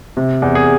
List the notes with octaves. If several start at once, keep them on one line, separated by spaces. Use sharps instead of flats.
C3
E2
G#4